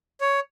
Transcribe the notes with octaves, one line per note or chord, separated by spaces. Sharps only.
C#5